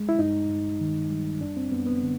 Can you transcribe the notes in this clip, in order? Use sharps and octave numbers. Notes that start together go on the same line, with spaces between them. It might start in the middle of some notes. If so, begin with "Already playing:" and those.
Already playing: G#3
E4
G2 D#4
G2
D#3
G3
F#2 D4
C4
F#2 B3
B3
D3